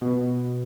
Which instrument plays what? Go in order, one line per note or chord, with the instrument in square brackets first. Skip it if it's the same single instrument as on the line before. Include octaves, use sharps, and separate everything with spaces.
[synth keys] B2